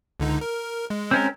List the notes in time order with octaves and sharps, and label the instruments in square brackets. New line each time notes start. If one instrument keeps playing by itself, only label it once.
[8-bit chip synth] C#2 D3 D#4
A#4
G#3
[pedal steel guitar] C4 C#4 A#4